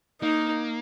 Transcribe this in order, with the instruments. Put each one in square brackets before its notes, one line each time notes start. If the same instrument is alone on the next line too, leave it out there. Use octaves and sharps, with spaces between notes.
[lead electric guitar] A#3 [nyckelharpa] D#4